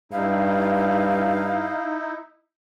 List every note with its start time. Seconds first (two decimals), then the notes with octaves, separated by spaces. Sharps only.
0.12 G2 D#4 E4 F5